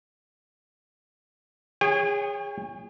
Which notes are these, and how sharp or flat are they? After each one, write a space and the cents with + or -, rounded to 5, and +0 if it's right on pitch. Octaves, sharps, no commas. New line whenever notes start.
G#4 -25 C#5 +0 G5 +40